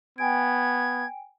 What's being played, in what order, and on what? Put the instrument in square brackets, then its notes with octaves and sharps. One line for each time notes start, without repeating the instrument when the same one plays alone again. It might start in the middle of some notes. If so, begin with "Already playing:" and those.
[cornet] B3 [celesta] G5 G#5 D7 [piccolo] G#6